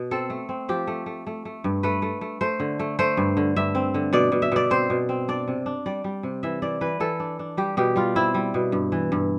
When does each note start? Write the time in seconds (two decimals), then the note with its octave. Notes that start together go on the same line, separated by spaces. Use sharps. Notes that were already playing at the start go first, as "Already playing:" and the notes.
Already playing: B2
0.11 C4 A4
0.30 A3
0.49 C4
0.69 F3 G4
0.87 A3
1.06 A3
1.27 A3
1.45 A3
1.64 G2
1.83 A3 B4
2.02 A3
2.21 A3
2.41 A3 C5
2.60 D3
2.79 A3
2.99 A3 C5
3.17 G2
3.37 D3
3.56 G2 E5
3.75 C4
3.94 D3
4.13 B2 D5
4.32 B2
4.42 E5
4.52 B2 D5
4.70 C4 C5
4.90 B2
5.09 C4
5.28 D4 D5
5.48 C3
5.66 D4
5.86 G3 D5
6.04 G3
6.23 C3
6.43 E3 E5
6.62 E3 D5
6.81 E3 B4
7.00 E3 A4
7.20 D4
7.39 D4
7.57 G3 G4
7.77 B2 G4
7.96 G3 F4
8.16 C4 E4
8.34 G3
8.54 B2
8.72 G2
8.92 E3
9.12 G2